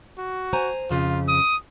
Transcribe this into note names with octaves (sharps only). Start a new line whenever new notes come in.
F#4
C5 G#5 A#5
F2 C#3 F4
D#6